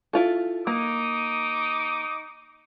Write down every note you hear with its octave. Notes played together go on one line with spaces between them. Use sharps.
E4 F4 A4
A#3 D#4 D6 D#6